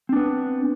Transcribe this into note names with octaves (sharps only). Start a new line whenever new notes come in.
B3 C4 D4